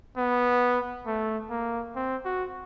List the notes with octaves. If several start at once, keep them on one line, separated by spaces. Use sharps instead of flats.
B3
A3
A#3
C4
F#4